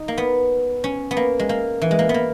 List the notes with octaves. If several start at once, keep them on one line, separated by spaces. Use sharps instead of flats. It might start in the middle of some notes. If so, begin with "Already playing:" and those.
Already playing: D#4
A#3
B3
C#4
B3
A#3
G#3
A#3
E3
G#3
A#3
B3
A#3